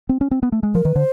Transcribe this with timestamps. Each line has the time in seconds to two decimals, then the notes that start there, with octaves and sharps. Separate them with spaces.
0.09 C4
0.21 C#4
0.31 C4
0.43 B3
0.52 A3
0.63 G#3
0.75 F3 A#4
0.85 D#3 B4
0.95 D3 C5